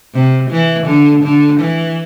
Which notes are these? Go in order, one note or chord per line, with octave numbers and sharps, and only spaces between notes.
C3
E3
D3
D3
E3